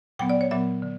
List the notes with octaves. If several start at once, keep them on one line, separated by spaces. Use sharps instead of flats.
A#2 F#3 B3 G5
D5
C#5
A#2 F#3 B3 E5
D3